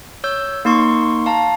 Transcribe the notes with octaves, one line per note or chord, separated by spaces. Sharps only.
C#5 E6 G6
A#3 D#4 C6 C#6
F5 A5 A#5